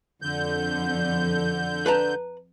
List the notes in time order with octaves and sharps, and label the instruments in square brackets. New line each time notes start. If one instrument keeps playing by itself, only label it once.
[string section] F2 [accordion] D3 G6
[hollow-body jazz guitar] B4 A5 A#5